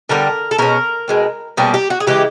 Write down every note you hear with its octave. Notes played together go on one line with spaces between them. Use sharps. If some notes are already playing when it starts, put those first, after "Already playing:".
D3 G3 B3 A#4
A4
B2 G#3 C#4 A#4
B2 G#3 C4
B2 G3 A#3 C#4 G#4
G4
F#4
G#4
C#3 E3 G#3 G4